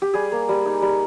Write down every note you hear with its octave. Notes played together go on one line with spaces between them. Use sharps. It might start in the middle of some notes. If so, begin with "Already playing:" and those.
G4
G3 G#4
A#3
G3
D#4
G3